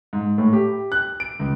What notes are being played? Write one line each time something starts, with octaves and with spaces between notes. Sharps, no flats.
G#2
A2
G4
F#6
D7
C#2